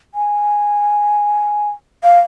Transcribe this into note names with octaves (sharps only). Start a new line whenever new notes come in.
G#5
F5